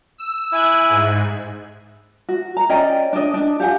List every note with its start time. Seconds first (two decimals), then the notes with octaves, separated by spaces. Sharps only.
0.18 E6
0.52 E4 G#5 F#6
0.90 G#2
2.29 F#4
2.57 A#5
2.69 C#4 D5 D#5 G5
3.13 D4 D#5
3.34 D4
3.60 G4 F5 F#5 G#5